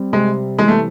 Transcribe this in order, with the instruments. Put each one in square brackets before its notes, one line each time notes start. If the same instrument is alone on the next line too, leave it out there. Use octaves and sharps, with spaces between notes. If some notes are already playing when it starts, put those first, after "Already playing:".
Already playing: [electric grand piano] G3 C4
[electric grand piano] C3 [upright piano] G#3
[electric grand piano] E3 [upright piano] G#3
[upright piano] A3